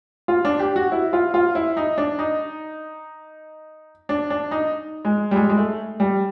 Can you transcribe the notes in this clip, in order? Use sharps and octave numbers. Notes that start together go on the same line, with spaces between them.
F4
D4
G4
F#4
E4
F4
F4
E4
D#4
D4
D#4
D4
D4
D#4
G#3
G3
G#3
G#3
A3
G3